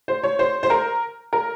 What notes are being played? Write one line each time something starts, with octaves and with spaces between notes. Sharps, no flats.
C5
C#5
C5
C5
A#4
A#4